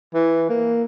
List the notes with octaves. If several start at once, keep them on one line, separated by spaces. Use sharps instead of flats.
E3
A#3